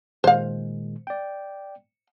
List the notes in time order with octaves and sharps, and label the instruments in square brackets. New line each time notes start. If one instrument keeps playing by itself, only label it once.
[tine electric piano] A#2 D#3 G#3 [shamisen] C5 F5
[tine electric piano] D5 G5